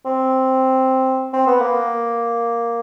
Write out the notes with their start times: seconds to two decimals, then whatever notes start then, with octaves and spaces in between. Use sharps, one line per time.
0.06 C4
1.33 C4
1.47 B3
1.61 A#3